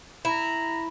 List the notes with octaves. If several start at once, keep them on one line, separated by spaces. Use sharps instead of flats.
E4 A#5